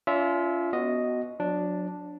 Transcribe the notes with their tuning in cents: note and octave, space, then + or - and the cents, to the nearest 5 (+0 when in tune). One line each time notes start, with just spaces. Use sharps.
C#4 +40 F4 -15 E5 -10
B3 +0 F#4 +0 D#5 +0
F#3 -35 D4 +0